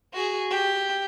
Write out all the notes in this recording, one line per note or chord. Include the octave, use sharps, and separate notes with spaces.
F#4 G#4
G4